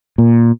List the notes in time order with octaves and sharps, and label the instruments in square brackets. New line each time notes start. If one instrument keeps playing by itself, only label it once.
[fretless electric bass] A#2